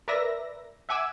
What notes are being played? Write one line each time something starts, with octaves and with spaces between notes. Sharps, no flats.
A#4 B4 D5 E5 A#6
E5 F#5 G#5 D6 E6